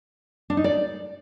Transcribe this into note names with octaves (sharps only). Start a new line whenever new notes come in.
D4
D#4
D5